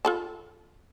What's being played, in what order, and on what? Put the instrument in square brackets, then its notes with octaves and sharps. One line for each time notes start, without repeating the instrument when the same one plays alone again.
[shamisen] F4 A4 A5